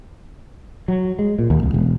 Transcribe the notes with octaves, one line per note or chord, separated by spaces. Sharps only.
F#3
G#3
A#2
D#2
C2
E1